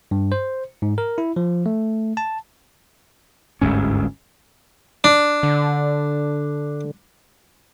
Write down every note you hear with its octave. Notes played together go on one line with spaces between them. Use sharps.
G2
C5
G#2
A#4
E4
F3
A3
A5
G1 D2 G#2 C#4
D4
D3